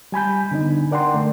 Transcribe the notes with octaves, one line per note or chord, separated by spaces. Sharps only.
G3 G#5 B5 G6
D3 B3 D4 D#4
A#4 D5 F#5 G5 C6
D3 A3